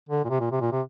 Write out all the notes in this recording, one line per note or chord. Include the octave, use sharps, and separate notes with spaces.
D3
A#2
C3
A#2
C3
A#2
C3